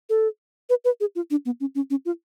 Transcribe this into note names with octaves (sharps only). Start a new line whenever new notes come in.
A4
B4
B4
G#4
F4
D4
B3
C#4
C#4
C#4
F4